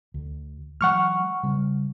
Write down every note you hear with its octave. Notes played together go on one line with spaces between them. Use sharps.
D2
E3 F#3 G#3 F#5 C#6 F6
C#3 G3